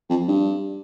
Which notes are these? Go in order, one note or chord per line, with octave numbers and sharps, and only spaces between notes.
F2
G2